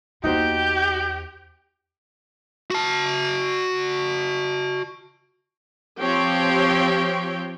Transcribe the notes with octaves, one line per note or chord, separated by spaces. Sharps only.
E2 A#3 D#4 F#4 G4 C5 G6
F#4 A5
F3 C4 G4 C#5 G5